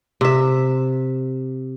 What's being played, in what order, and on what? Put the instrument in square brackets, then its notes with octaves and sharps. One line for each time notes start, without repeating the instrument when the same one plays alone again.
[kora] C3 E5